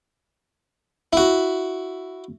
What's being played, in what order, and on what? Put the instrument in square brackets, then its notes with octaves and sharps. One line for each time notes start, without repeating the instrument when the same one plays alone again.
[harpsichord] E4 F#4